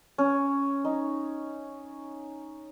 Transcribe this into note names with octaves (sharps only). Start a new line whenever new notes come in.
C#4
D#4